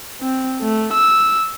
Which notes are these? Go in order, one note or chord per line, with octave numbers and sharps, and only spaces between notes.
C4
A3
E6